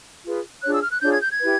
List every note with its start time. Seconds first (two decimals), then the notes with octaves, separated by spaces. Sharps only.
0.25 F4 G#4 B4
0.63 D4 F4 G#4 C#5 F#6
0.73 E6
0.83 F6
0.92 F#6
1.02 D4 F4 G#4 C#5 G6
1.12 G#6
1.21 G6
1.31 G#6
1.40 E4 G4 B4